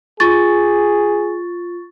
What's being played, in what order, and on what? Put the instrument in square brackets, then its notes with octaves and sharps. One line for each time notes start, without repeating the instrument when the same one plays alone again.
[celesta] F4 C#6 A6 [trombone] G#4